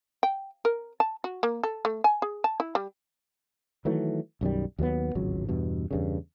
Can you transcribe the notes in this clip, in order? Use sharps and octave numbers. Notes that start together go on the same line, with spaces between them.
G5
A#4
A5
F#4
A#3
A4
A3
G#5
G#4
A5
E4
G3
D#3 E3 F#3 A3
B1 F#2 D#3 G3
D#2 F#3 A#3 B3
D1 G#1 C#2 F#3
E2 G2 B2
E2 G2 C#3